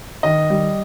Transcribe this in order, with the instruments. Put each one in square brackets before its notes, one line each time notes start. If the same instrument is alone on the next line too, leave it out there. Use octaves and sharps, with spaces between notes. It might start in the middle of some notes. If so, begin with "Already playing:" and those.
[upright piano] D#3 D#5
G3